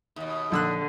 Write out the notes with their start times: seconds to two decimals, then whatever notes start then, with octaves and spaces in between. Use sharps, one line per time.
0.16 D#2 B2
0.52 A#1 D3 E6 F#6